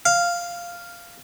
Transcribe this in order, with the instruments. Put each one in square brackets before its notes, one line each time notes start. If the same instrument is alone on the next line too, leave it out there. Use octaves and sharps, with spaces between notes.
[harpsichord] F5